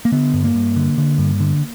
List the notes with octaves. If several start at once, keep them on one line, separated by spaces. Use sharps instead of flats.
A#3
D3 B3
G2
A#3
G2
D3
D3
G2
D3